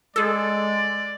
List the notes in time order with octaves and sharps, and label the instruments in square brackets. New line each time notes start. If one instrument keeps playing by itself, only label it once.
[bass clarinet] G#3 [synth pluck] G#4 A4 [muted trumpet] D5 [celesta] E6